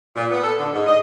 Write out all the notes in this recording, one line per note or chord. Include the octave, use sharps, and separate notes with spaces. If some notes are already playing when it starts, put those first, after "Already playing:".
A#2
B3
A4
D3
G#2
D#5